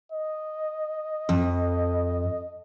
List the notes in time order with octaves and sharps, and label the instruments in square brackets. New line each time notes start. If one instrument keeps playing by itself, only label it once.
[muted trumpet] D#5
[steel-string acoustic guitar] F2